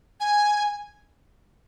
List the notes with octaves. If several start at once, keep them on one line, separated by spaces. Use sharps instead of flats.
G#5